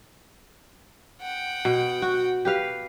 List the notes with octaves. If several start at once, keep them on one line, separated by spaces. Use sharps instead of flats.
F#5 G5
B2
F#4
G4 B4 F5